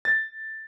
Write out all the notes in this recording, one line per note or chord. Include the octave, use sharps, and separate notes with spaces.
A6